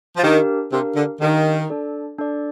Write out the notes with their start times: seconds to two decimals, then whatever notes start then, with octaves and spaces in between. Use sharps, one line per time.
0.17 F3
0.23 D#3 D4 G4 A#4 F5
0.72 C3 D4 G4 A#4 F5
0.96 D3
1.21 D#3 D4 G4 A#4 F5
1.70 D4 A4 D5
2.19 D4 A4 D5